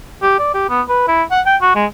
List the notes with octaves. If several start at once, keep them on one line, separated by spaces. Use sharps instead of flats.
G4
D5
G4
B3
B4
E4
F#5
G5
F#4
G#3